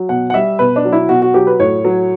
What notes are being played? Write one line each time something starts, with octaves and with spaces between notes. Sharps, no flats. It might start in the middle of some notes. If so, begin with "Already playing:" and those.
Already playing: F#3
B2 F#5
F#5
G3 E5
B2 B4
D4
F#3
E4
B2 F#4
F#4
F#3 G4
B4
A2 C#5
F#3